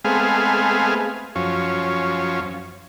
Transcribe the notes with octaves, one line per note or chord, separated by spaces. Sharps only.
G#3 A3 B3 C4 G#4 F5
F#2 F3 C#4